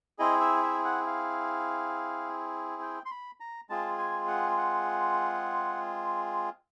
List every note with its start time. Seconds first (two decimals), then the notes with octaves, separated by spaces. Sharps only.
0.19 C4 E4 G#4 D#5
0.41 E5
0.63 E5
0.85 F#5
1.06 F5
2.82 G5
3.05 C6
3.11 B5
3.40 A#5
3.69 G#3 C4 F4 G#4 A5
3.98 G#5
4.28 F#5
4.57 F#5